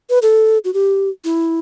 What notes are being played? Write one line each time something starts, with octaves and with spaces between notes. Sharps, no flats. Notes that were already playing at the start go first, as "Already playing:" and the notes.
B4
A4
F#4
G4
E4